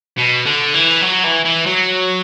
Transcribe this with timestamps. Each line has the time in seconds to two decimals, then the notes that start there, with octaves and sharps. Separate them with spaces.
0.18 B2
0.46 D3
0.75 E3
1.02 F#3
1.24 E3
1.45 E3
1.66 F#3